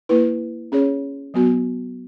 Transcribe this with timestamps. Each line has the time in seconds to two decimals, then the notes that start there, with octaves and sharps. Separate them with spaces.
0.09 A#3 E4 B4
0.72 C#4 G#4 C#5
1.34 F#3 B3 F#4